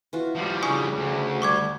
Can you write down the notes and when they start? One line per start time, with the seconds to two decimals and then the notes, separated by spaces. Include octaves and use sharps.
0.13 E3 F4 F#4
0.35 F3 G3
0.63 C#3 D4 G#5 C#6 D#6
0.95 D2
1.42 G3 F#5 C#6 D6 G#6